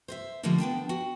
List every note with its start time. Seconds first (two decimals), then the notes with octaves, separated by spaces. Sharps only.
0.08 C5 D#5 E5
0.43 D3 F3 G3 A3 A#3 D4
0.58 B3 D4 G5 A5
0.89 F#4